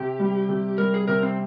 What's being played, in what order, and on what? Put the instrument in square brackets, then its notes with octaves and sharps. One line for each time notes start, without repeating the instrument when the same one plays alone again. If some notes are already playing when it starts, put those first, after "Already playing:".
Already playing: [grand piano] C3 [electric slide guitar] G4
[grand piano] G3
C3
[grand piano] G3 [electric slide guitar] A#4
[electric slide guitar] G#4
[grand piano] C3 [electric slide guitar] A#4
[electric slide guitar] C4